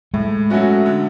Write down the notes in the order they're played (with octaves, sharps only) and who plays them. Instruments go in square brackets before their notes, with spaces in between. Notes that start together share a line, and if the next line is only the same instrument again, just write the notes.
[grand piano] A2 [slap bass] G#3
[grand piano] F#3 A3 C#4 F#4
D3